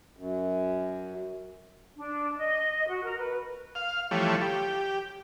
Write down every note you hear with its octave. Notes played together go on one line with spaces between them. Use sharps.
F#2
D4
D#5
F#4
A#4
B4
F5
E3 F3 G3 A3 C#5
G4